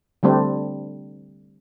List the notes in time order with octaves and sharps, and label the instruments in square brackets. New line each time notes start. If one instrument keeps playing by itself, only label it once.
[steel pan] D3 G3 A3 C4 D4